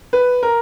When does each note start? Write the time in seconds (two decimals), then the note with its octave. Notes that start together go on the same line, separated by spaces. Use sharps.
0.13 B4
0.43 A#4